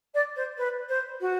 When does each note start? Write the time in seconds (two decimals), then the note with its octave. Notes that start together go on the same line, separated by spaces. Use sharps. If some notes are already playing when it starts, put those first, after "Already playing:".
0.14 D5
0.36 C5
0.57 B4
0.88 C5
1.20 F#4